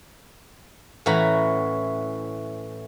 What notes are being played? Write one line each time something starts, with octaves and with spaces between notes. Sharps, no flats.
A2 E3 C#4 F#4 A#5 B5